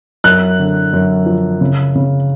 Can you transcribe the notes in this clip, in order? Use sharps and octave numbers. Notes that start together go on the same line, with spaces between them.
F#2 F#6
D3
F#2
F3
C#3
C#3